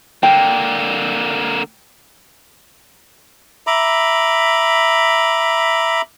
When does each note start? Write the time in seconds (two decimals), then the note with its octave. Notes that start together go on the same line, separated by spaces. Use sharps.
0.23 D3 A#3 G5
3.67 E5 A#5 B5 D6